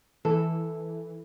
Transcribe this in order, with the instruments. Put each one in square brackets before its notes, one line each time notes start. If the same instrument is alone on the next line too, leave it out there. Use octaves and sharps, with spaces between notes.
[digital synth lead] E3 [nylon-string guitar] A4